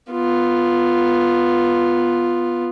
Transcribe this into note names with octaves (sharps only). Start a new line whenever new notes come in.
B3 F4